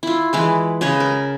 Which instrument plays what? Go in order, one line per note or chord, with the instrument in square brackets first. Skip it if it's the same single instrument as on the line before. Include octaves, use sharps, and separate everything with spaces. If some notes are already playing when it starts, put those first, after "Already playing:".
[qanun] E4 F4
E3 G#3 B4
C#3 B4 C#5 D#5
A#4